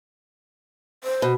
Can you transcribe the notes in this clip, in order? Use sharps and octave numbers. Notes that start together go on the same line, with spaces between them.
C5
B2